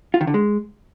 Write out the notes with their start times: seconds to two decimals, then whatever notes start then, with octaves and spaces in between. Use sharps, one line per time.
0.14 F4
0.21 D#3
0.27 D3
0.34 G#3